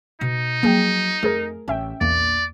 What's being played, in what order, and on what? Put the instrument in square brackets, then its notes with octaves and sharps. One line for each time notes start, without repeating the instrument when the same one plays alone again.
[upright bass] B2 [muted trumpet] D#4
[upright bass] F3 F#3 [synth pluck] A#3 G#4 G5
[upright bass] F2 [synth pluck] A3 G#4 A#4
[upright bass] A1 [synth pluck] C#4 E5 G5
[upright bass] A#1 [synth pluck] E2 A#3 [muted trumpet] D5